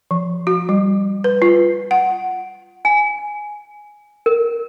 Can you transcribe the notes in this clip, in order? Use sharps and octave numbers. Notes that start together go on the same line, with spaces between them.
F3
F#4
G3
B4
F4
F#5
G#5
A#4